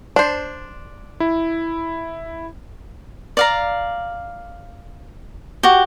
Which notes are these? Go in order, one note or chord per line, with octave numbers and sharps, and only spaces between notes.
D4 C5
E4
D5 F5 A#5
F#4 G4